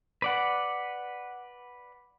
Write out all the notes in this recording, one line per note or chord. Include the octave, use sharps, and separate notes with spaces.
B4 D5 F#5